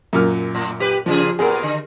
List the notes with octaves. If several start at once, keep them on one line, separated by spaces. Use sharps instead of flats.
F#2 A#2 F6
A2
G4 B4
A#2 C#3 F3 G#4
A#2 B3 G#4 A#4
D3